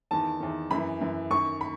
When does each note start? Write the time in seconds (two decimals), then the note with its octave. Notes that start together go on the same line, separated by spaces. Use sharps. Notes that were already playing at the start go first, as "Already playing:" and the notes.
0.11 E2 D#3 A5
0.40 E2 D#3
0.70 F#2 E3 B5
1.01 F#2 E3
1.30 F#2 D#3 C#6
1.61 B5